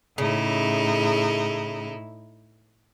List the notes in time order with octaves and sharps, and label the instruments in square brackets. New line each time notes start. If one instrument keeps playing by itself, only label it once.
[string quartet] A2 D#4 E4 [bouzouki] C#3